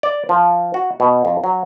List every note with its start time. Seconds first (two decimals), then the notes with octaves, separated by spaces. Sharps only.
0.03 D5
0.29 F3
0.74 F#4
1.00 B2
1.25 F2
1.44 F#3